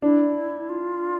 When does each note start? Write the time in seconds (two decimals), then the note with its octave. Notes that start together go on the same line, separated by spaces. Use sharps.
0.02 D4 E4
0.69 F4